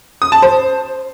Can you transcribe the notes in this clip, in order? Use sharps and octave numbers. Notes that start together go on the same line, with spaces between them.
D#6
A5
C5